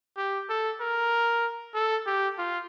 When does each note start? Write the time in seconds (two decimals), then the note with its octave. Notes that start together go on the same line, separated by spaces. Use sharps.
0.17 G4
0.49 A4
0.80 A#4
1.74 A4
2.06 G4
2.38 F4